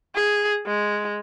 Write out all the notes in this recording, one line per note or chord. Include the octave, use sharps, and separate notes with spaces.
G#4
G#3